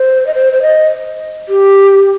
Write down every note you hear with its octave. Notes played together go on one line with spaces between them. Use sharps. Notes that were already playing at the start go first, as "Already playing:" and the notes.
Already playing: C5
D#5
C5
C5
D#5
G4